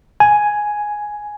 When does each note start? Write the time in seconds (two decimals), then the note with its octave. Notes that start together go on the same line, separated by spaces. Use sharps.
0.20 G#5